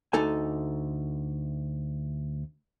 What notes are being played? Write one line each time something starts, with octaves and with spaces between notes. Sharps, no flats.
D2 D#4 A4 G#5